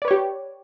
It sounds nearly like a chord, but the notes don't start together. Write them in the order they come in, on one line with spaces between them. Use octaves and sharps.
D5 B4 C#5 G4